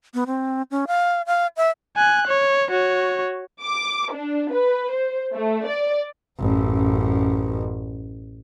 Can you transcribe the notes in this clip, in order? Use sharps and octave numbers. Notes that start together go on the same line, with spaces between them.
B3
C4
C#4
F5
F5
E5
G#5 F#6
C#5
F#4 C#5
D6
D4
B4
C5
A3
D5
A1 F#2